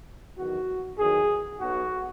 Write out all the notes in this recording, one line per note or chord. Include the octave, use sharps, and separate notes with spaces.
E2 D#3 F#3 F#4
E2 D#3 F#3 G#4
B1 B2 F#3 F#4